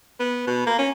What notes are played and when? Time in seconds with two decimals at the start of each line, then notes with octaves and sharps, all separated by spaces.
0.20 B3
0.47 B2
0.67 A#3
0.79 C#4